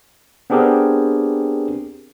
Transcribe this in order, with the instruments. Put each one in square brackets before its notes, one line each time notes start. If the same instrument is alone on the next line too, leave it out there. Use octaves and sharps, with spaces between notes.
[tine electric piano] B3 C4 D4 G4 G#4 A#4